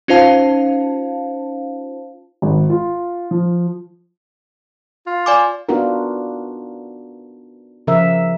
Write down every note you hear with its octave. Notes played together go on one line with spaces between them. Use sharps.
C#4 D#4 F4 C5 F5 A5
G#1
F4
F3
F4
D5 G#5 D6
B3 D4 D#4 F4 F#4 A#4
C#3 F3 A#4 E5